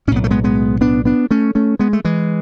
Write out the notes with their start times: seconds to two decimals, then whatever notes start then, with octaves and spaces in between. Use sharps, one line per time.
0.07 A2 C#4
0.12 B1 B3
0.24 A3
0.31 G#3 B3
0.44 G#3 B3
0.81 B3 D4
1.05 B3 D4
1.31 A3 C#4
1.55 A3 C#4
1.79 G#3 B3
1.93 A3
2.05 E3 G#3